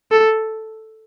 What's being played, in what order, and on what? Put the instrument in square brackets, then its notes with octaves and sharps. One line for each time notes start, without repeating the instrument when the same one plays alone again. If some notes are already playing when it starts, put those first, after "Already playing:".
[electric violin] A4